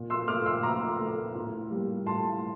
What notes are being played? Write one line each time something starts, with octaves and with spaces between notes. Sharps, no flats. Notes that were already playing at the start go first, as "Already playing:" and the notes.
Already playing: A#2
C6 E6
A3 D6 F6
C6 E6
A#2 A#5 D6
A3
A2
G3 A#3
A2 A5 C6